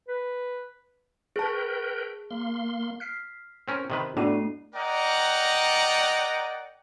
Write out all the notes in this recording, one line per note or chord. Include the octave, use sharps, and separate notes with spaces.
B4
G#4 A#4 B4 G5 A5
A#3 C6
F6 B6 C7
C4 C#4 A#4
C3 D#3 B4
A2 A3 B3 D4 F#4 C7 D#7
A#4 D5 D#5 F#5 G5 A#5